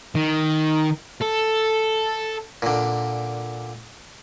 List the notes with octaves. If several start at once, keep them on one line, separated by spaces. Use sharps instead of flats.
D#3
A4
A#2 D3